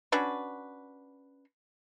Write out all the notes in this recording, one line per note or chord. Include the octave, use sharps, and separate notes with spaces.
C#4 D4 F#4 B4